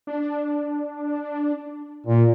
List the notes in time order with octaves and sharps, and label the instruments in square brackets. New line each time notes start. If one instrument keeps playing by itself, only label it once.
[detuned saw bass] D4
[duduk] A#2